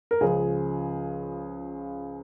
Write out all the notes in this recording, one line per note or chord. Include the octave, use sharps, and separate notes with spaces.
A#4
C#2 C#3 F3 G#4